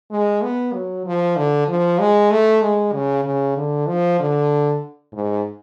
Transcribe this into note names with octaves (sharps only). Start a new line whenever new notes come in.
G#3
B3
F#3
F3
D3
F3
G#3
A3
G#3
C#3
C#3
D3
F3
D3
G#2